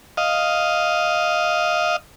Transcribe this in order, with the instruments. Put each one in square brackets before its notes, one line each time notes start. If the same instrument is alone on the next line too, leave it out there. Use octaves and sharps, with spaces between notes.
[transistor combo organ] D#5 F5